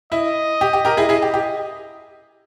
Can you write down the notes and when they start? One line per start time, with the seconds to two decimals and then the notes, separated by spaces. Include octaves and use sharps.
0.12 E4 D#5
0.61 G4
0.73 G4
0.85 G4 A#4
0.97 E4 G#4
1.09 E4 G#4
1.22 G4
1.34 G4